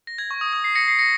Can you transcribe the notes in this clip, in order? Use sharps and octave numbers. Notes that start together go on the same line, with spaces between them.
A#6
G#6
C#6
D#6
D#6
C7
A#6 C#7
C7
A#6 C#7